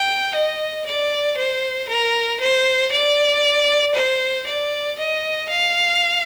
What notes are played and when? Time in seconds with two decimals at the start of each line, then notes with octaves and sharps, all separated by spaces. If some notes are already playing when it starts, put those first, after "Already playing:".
Already playing: G5
0.34 D#5
0.86 D5
1.37 C5
1.89 A#4
2.41 C5
2.92 D5
3.95 C5
4.47 D5
4.99 D#5
5.49 F5